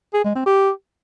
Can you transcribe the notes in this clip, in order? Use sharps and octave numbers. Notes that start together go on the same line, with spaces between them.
G#4
G#3
C4
G4